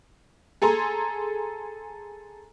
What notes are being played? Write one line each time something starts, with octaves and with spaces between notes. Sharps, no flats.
G#4 A4 G#5 A#5 C6